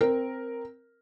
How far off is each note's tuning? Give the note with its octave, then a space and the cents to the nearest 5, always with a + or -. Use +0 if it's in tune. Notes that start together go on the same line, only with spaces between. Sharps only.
C4 +0 A#4 +0